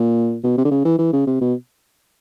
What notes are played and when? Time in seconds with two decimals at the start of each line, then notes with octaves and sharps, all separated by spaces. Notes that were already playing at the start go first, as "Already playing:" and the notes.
Already playing: A#2
0.44 B2
0.58 C3
0.65 D3
0.71 C#3
0.85 E3
0.99 E3
1.13 C#3
1.27 C3
1.41 B2